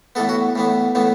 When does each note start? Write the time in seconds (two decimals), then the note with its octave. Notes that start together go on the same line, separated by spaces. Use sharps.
0.15 A2 E3 B3 A4
0.29 F#4
0.55 A2 E3 B3
0.95 A2 E3 B3